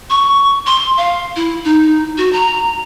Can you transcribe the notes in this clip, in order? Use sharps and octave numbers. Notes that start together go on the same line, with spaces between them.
C#6
C6
F5
E4
D#4
F#4
A#5